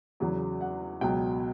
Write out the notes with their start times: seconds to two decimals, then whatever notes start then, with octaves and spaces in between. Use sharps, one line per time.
0.20 E2 C#3 F#3
0.61 F#5
1.01 C#2 B2 F#3 G5